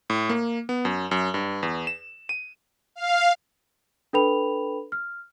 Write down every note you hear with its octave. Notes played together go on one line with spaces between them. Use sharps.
A2
A#3
B3
F#2
F#2
G2
E2
E7
D#7
F5
D4 A4 B4 G5 B5 F7
F6